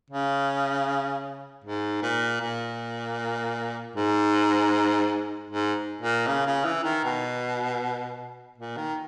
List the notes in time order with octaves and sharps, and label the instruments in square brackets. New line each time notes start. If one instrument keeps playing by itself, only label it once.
[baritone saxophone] C#3
G#2
A#2
A#2
G#2
G#2
A#2
C#3
C#3
E3
D#3
B2
A#2
D#3